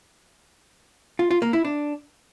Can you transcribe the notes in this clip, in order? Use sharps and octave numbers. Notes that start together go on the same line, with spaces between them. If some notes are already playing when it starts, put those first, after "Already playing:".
F4
F4
A#3
E4
D4